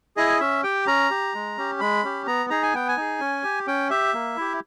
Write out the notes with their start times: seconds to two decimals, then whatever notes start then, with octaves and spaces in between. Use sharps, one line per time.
0.17 E4 G#4 D#5
0.40 C#4 E5
0.64 G4 G5
0.87 C#4 A#5
1.10 G4
1.34 G#3
1.58 C#4 G4
1.80 G#3 B5
2.04 C#4 G4
2.27 B3 A#5
2.50 D#4 G#4 A#5
2.63 G#5
2.74 B3 G5
2.88 G#5
2.97 D#4 G#4
3.20 C#4
3.43 G4
3.67 C#4 G5
3.90 G4 E5
4.14 A#3
4.36 E4 G4